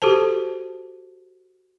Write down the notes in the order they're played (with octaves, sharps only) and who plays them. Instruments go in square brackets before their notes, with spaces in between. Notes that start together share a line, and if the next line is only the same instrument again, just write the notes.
[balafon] F#4 G4 A4 C5 A5